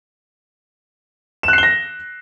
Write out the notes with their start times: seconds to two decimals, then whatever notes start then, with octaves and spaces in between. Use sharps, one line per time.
1.43 E7
1.48 F#6
1.53 C7
1.58 G7
1.63 A#6